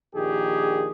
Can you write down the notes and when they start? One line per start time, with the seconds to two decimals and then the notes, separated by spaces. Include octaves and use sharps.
0.14 A#1 D#3 G4 G#4